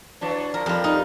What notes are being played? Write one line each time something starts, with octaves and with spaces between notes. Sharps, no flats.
E3 F#3 D4
F3 A#4
F2 G3 F4
D#4